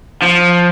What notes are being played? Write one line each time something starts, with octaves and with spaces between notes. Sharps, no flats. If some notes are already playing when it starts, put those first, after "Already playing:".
F3